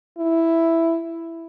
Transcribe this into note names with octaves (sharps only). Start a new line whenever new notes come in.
E4